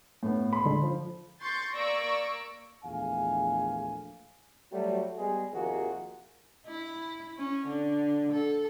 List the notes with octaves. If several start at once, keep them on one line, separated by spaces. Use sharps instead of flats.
A2 B3
B5 C6
D3 G#3 A4
F3
C6 C#6 G6 A6
A#3 D5 C#6 E6 A#6 D7
A#1 E2 A3 F5 G#5
F#3 G3 A3
G3 G#3 B3 G#4
D#2 C3 F3 A#3 F#4 G#4
E4
C#4
D3
A4